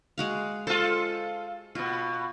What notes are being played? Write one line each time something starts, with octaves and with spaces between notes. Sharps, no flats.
G#3 F#4 F5
F4 A4 C5
B2 B3 F4